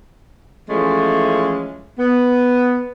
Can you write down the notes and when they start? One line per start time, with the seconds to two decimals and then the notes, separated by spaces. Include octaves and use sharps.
0.68 E3 F3 G#3 A3 C#4
1.98 B3